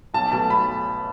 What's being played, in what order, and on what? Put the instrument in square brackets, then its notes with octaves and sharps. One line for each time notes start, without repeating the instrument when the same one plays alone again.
[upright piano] B1 A5
B2 A3 A5
B1 B5